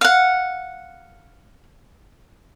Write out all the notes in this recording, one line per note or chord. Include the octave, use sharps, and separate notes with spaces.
F5 F#5